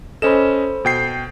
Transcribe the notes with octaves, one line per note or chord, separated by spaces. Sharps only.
C#4 A4 C5 D#5 B5 E7
B2 G5 C7